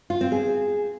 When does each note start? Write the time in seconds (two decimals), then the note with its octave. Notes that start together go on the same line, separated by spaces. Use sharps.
0.10 F4
0.21 C4
0.32 G#4